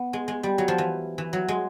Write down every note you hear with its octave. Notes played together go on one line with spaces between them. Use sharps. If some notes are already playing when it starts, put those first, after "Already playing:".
Already playing: B3
G#3
G#3
G3
F#3
F3
E3
E3
F#3
G#3